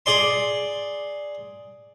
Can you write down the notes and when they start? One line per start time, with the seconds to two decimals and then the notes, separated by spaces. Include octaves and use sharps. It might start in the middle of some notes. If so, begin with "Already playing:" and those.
0.06 G#4 D5 C6